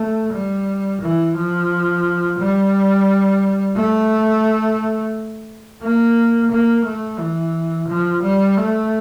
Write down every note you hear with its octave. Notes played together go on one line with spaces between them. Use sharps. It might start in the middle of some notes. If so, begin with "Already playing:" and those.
Already playing: A3
G3
E3
F3
G3
A3
A#3
A#3
A3
E3
F3
G3
A3